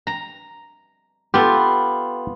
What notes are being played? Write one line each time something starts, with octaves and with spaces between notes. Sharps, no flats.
A#5
B3 F4 G4 A4